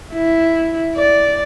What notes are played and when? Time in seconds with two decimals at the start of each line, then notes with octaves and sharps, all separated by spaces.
0.12 E4
0.95 D5